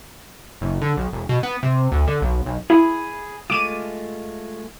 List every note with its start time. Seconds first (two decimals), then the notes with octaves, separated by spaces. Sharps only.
0.61 F#1
0.82 D3
0.97 B1
1.13 E1
1.29 B2
1.43 B3
1.63 C3
1.92 D2
2.07 D3
2.22 B1
2.46 B1
2.70 E4 G#4 B5
3.50 G#3 A3 F4 D6 D#7